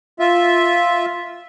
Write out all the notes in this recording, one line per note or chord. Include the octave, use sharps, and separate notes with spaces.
F4 E5